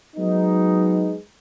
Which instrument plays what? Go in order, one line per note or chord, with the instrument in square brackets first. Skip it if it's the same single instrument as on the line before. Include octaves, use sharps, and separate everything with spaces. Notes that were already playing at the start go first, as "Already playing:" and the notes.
[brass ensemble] F#3 G#3 B3 D#4